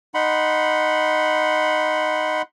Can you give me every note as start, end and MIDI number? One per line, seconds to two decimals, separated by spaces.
0.14 2.42 63
0.14 2.42 78
0.14 2.42 83
0.14 2.42 84